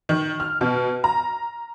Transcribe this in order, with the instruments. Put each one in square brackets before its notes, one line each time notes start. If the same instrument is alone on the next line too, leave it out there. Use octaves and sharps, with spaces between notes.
[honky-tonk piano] D#3
F6
B2
A#5